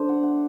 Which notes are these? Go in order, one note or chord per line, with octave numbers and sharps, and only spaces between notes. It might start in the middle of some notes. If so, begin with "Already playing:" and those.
Already playing: D3 D4 C5 D5
F#5
F#5